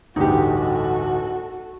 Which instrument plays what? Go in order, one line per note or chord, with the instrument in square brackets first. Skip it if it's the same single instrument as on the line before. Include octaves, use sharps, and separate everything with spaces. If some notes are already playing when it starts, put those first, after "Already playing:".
[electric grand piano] A1 D2 G2 [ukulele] D#4 G4 [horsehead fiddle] F#4 A4